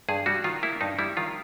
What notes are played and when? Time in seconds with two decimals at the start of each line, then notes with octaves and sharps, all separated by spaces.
0.09 G2 G#4
0.26 G3 F#4
0.44 D#3 F4
0.63 A#3 E4
0.81 G2 D#4
0.99 G3 E4
1.17 D#3 F4